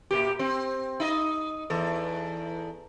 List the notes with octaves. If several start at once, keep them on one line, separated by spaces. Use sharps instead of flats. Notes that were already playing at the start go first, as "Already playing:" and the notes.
A#2 A#3 G4
C4
D#4 D#5
E2 A4